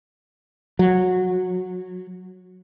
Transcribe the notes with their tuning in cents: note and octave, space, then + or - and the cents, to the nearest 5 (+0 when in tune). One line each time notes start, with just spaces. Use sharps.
F#3 -15